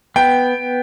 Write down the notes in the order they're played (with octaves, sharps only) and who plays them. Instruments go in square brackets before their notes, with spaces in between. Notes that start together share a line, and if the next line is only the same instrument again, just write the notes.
[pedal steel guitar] B3 [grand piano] G5